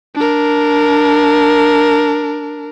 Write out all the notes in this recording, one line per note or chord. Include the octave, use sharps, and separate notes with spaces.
D4 A#4